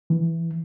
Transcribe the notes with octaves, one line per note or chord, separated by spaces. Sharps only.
E3